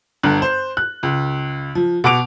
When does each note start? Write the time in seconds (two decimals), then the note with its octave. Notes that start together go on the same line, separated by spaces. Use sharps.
0.23 G1 G2 F#6
0.42 C5
0.77 F#6
1.03 C#2
1.75 F3
2.04 B2 F#5 D6 D7 F7